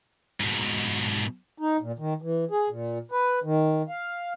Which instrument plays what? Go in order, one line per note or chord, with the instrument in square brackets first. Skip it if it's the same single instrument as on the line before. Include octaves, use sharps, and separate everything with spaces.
[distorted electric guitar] G#2 B2
[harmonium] D#4
A#2
D#3
E3
G#4
A#2
B4
D#3
F5